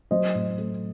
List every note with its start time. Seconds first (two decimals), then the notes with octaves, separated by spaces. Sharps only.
0.11 F#3 C5 D#5
0.35 A2
0.58 A3